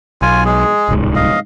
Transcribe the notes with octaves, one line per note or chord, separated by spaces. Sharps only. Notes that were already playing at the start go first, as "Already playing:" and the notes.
B1 F4 G#5
G#3 G#4
D1 C2 G#2
D#5 F5